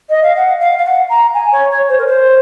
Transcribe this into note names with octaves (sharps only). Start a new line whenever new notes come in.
D#5
F5
F#5
F5
F5
F#5
A#5
G#5
C#5
C#5
C5
A#4
C5